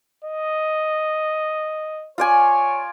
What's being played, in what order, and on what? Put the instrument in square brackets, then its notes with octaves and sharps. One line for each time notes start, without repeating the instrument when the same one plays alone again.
[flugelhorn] D#5
[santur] F4 D5 G#5 [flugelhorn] C#5